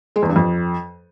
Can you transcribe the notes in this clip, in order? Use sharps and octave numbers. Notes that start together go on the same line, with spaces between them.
G#3
E2
G2
F2